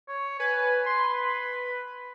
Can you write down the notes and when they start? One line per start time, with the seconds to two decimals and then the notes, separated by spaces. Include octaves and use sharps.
0.08 C#5
0.40 B4 G#5
0.86 C6
1.14 B5